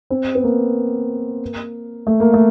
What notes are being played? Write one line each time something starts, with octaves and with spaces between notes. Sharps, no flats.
C4
B3
A#3
A3
A#3
A3